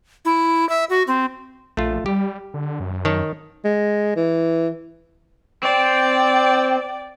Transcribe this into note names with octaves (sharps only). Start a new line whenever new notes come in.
E4
E5
F#4
C4
A#1 A3 F4
G3 G4
D3
F#2
D#3 C#5 A5
G#3
E3
C4 D5 G5